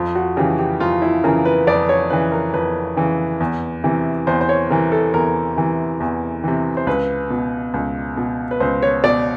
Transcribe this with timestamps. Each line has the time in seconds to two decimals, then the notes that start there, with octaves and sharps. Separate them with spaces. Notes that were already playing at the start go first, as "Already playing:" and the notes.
Already playing: F2 F4
0.15 F#4
0.37 C#3 E3 G4
0.59 G4
0.80 F2 F4
1.02 E4
1.24 C#3 E3 A#4
1.45 B4
1.67 F2 D5
1.89 C#5
2.10 C#3 E3 B4
2.32 A#4
2.54 F2 B4
2.97 C#3 E3
3.40 E2
3.84 C3 E3
4.27 E2 C5
4.41 C5
4.49 C#5
4.70 C3 E3 A#4
4.92 A4
5.14 E2 A#4
5.57 C3 E3
6.00 E2
6.44 C3 E3
6.77 C5
6.87 C#2 B4
7.30 B2
7.74 C#2
8.17 B2
8.51 B4
8.60 C#2 C5
8.82 C#5
9.04 B2 D5